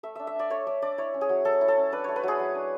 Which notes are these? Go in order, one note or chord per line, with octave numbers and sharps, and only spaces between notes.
A3 E5
D4 E5
E5
D4 D5
A3 C#5
A3 D5
D4 D5
E4 C#5
C#4
G#4
F#3
F#3 A4
E4
A4
C#4
D4 B4
A3 C#5
B4
F#3 G#4
F#3
D4